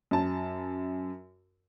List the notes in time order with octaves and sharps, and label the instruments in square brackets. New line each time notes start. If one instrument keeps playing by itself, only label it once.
[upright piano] F#2 A5